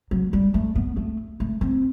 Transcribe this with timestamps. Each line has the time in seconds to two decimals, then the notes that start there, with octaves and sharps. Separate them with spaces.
0.11 F#3
0.33 G3
0.54 A3
0.75 B3
0.97 A3
1.40 A3
1.61 C4